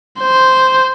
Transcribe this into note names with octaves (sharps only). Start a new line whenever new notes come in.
C5